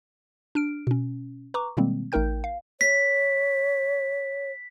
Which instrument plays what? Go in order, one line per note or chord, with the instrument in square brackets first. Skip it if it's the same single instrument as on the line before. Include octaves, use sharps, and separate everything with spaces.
[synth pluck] D4 F6 D7
B2 C#4
B4 A#5 C#6 D6
B2 D#3 G3 G#3 A#3 C4
A1 A3 D#4 A#4 G5 G6
F5
[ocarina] C#5 [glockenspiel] B6